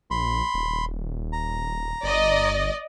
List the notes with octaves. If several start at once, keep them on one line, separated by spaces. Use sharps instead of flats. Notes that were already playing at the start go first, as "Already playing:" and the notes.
A#1 B5 C6
D#1
A#5
G1 D5 D#5